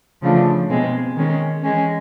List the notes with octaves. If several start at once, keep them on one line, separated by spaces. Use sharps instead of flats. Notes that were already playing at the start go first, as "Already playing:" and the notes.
C#3 F3 A3 D4 F4
B2 G#3 C4
D#3 G#3 C#4
E3 G#3 C#4